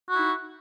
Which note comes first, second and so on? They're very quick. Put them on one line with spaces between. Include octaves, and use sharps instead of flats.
F#4 E4 D#4